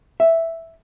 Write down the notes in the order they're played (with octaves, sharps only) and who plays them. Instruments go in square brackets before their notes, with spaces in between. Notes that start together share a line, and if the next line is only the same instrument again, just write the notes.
[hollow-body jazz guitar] E5